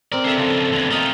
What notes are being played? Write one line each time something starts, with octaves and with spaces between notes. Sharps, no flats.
C4 A#4 D5
D4 A4 C5 E5
C#3 F3
E2 D3
A3 F4 A#4 D#5 G5